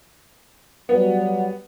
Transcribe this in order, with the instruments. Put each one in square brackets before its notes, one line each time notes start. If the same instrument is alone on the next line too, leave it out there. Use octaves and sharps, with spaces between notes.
[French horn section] F#3 G3 [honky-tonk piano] B3